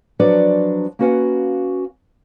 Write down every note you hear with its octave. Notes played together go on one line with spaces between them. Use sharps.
F3 F#3 D4 F#4 B4 D5
A#3 C#4 F#4 B4 F5 F#5